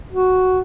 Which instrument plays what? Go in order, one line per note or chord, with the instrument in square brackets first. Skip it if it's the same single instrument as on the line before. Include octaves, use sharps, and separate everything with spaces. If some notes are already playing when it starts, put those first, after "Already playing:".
[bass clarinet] F#4